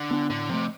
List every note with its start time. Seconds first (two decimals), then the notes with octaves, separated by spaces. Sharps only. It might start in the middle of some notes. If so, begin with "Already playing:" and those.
Already playing: D3
0.11 B3 D4
0.30 A2 D3
0.49 C3 F3 A3